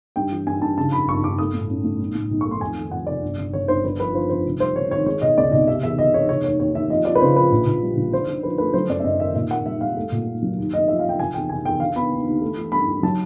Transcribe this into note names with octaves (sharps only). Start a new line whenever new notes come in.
G2 G5
E3
G2 G#5
G2 A5
C#3 A5
F2 B5
G1 C#6
G1 D6
A3 D#6
A2
C#4
A2
B1
A2
B1
C#6
A3
C6
F2 G#5
D#3
F2 F#5
C3 D5
G1
D3
D3 C#5
G1 C5
D3 B4
F3 B4
F3 C5
F2 C5
F1
G3 C5
F1 C#5
D#3 C#5
G#3 C#5
B2 D#5
C#2 D5
B2 D#5
C3 E5
E2 E5
E1 D#5
E2 C#5
F1 C#5
D#2 C#5
D#2 C#5
D#2 E5
F3 D#5
F3 D5
B4
C#3 C5
F3 B4
A#1
A#1
G3
A#1
D3 C5
D3
F3 B4
A3 B4
F#3 C5
F#2 D5
E5
F#2 D#5
D#3 E5
A#2 E5
A#3 F#5
G3 E5
G3 F5
A3
A#2
A3
F#3
D#2
D#2 D#5
F3 E5
F3 F5
G5
F1 G#5
E2 G5
F1 G#5
E2 G5
D3 F5
B3 B5
D#2
D#2
A3
E3
G2 B5
E3
F#3 A5